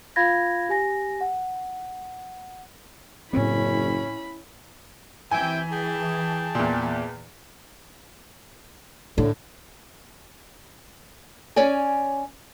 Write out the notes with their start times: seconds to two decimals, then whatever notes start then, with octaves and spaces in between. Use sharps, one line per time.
0.16 F4 F5 B5 G#6 A#6
0.69 G4 G#5 A#6
1.21 F#5
3.33 F#1 A2 C4 C#4 E4 B5
5.31 C3 E3 E4 G5 G#5
5.71 G#4 G5 A5
6.55 E2 A#2
9.18 A2 D3
11.56 C#4 C#5 D5 G#5